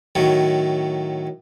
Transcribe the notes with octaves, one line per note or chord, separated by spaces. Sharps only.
A2 D#3 F#3